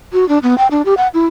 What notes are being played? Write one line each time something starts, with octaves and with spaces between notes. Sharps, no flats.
F#4
D4
B3
G5
D4
G4
F#5
E4